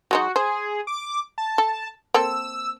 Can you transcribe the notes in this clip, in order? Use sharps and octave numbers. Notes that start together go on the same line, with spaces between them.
F#3 G#3 D#4 F#4
G#4 C5
D6
A5
A4
A#3 C4 A4 E6